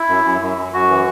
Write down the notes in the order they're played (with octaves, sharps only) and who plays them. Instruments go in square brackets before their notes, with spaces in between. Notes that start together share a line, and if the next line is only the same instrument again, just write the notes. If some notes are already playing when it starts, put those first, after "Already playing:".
Already playing: [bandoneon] E4
F#2
F#2
F#2
F#2
F#2 F#4
E3